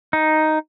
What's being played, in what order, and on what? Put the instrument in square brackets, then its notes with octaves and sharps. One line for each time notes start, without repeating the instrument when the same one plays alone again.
[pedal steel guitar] D#4